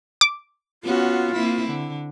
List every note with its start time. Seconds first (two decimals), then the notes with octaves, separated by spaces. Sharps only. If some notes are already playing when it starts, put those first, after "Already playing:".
0.21 D6
0.84 B3 C#4 F4 F#4
1.34 A#3 C4 E4
1.69 D3